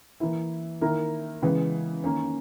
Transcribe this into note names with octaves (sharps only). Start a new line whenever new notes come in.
E3 A#3 E4
D#3 A#3 E4 A#4
C#3 E3 G#3 B3
D#3 A#3 C#4